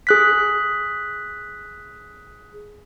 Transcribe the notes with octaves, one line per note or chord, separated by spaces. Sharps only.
G#4 F#6 B6